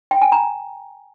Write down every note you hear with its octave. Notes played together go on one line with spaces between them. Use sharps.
G5
G#5
A#5